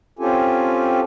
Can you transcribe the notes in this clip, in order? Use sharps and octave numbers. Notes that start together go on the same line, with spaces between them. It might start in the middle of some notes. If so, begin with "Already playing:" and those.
C4 C#4 F4 G4 A4 G#5